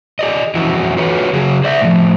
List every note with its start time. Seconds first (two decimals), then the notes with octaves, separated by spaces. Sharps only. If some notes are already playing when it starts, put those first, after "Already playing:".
0.19 G4 D5 D#5
0.55 F2 E3 C#4 E4 F#4
0.97 F4 F#4 B4 C#5
1.33 C#3 F#3 G#4
1.64 C5 D5 E5
1.81 A2 F3